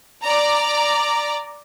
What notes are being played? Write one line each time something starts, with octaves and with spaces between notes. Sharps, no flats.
D5 A#5